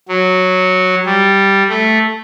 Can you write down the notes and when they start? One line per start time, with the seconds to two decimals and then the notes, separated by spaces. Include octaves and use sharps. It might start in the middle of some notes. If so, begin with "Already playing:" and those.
0.08 F#3
1.05 G3
1.69 A3